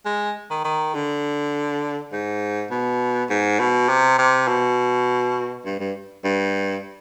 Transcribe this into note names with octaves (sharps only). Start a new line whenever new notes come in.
G#3
D#3
D#3
D3
G#2
B2
G#2
B2
C3
C3
B2
G2
G2
G2